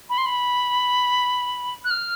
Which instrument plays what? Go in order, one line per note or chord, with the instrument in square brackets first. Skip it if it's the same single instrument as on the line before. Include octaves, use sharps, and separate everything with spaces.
[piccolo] B5
C6
B5
F#6
F6